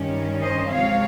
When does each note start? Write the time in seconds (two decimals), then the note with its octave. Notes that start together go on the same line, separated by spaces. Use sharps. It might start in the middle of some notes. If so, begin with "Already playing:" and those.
Already playing: G2 D#3 G3 C#4
0.42 C5 D#5
0.72 C3 F3 G#3 C4 C#5 F5